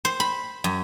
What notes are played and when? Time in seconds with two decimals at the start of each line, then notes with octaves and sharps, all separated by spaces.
0.05 C5
0.20 B5
0.64 F#2